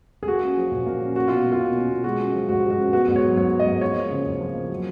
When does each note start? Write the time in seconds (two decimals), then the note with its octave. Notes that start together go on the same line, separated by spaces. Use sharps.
0.23 G#4
0.27 A#3 F#4
0.42 C#4
0.57 F3
0.72 A#2
0.86 A#3
1.00 C#4
1.15 C#4 F#4
1.28 B2 F4
1.46 A#3
1.52 F4
1.60 B2
1.75 C#4
1.90 B2
2.04 G#3 F#4
2.19 C#4
2.34 F3
2.49 G#2 F#4
2.64 G#3
2.70 F#4
2.78 C#4
2.92 B3 F#4
3.08 G#2
3.16 C#5
3.23 F#3
3.37 G#2 C#5
3.52 B3
3.60 D#5
3.67 G#2
3.81 F3 C#5
3.96 A#3
4.10 C#3
4.26 F2
4.41 F3
4.55 A#3
4.70 F#3